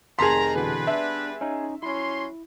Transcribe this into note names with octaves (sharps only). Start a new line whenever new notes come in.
F1 D#3 G#4 A5 A#5 C6 B6
B2 D3 E3 G3 B3 B4
D4 E5
C#4 D#4
F#3 C#4 E4 C6